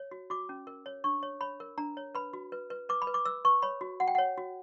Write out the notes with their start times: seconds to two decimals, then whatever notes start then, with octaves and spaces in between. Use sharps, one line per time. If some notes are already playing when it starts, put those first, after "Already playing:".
Already playing: C#5
0.11 F#4
0.30 F#4 D6
0.49 C#4
0.67 A#4
0.86 C#5
1.04 D4 C#6
1.23 C#5
1.41 C#5 B5
1.60 A#4
1.78 D4 A#5
1.97 C#5
2.15 B4 B5
2.33 F#4
2.52 B4
2.70 B4
2.89 B4 D6
3.02 B5
3.07 B4
3.14 D6
3.25 B4 E6
3.45 B4 C#6
3.62 C#5 B5
3.81 F#4
4.00 F#4 F#5
4.08 G5
4.15 C#5 F#5
4.38 F#4